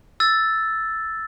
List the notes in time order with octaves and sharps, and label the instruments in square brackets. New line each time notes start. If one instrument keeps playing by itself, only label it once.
[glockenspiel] E6 A6